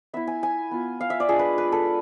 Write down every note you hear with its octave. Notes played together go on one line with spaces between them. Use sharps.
B3 E4 E5
G#5
G#5
B3 F4
F5
E5
D5
G#3 D4 F4 G#4
B4
B4
A4